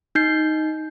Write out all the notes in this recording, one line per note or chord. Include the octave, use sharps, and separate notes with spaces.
D#4 G6 C7